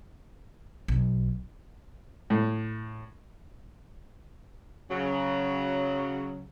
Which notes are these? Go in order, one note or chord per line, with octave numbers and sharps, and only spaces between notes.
B1
A2
C#3 F#3